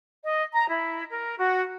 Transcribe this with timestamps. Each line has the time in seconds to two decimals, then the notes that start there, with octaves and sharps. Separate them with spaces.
0.25 D#5
0.54 A#5
0.70 E4
1.11 A#4
1.38 F#4